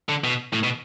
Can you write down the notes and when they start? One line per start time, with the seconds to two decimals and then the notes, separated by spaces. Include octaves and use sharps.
0.09 D3
0.24 B2
0.54 A2
0.64 B2